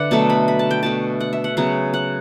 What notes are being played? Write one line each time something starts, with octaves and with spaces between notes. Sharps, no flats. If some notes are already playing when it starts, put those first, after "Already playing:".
Already playing: D3 B4 D5 E5 F#5
B2 F#3 A3 A5
B5
B5
A5
G5
B2 A3 A5
F#5
E5
F#5
C#3 F#3 B3 F#5
F#5